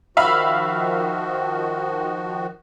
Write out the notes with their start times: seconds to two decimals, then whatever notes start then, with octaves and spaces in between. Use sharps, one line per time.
0.17 D#3 F3 F#4 E5 F5 B5